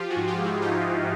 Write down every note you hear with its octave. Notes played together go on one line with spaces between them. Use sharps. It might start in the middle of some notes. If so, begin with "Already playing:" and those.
Already playing: F3 F4 G4
F#4 G#4
G#2
F4 G4
F3
E4 F#4
F3 D#4 F4
G#2